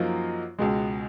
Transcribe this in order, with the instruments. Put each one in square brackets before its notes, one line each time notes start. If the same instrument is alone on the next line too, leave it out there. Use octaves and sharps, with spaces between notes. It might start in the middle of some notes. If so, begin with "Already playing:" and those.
Already playing: [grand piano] F#2 F3 A#3 D#4 F#4
C#2 B2 G#3